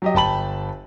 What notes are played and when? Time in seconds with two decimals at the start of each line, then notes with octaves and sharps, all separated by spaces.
0.02 F#3 G4 D#5
0.14 G1 G5 A5 B5 F#7